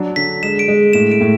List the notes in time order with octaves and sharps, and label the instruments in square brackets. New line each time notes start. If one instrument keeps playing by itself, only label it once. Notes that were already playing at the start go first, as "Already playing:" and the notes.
Already playing: [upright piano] F#3 D4
[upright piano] D3 [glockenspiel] B6
[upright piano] G#3 [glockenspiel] E7
[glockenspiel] D7
[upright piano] G#3
[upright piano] A2 [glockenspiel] E7
[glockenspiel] D7
[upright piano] A2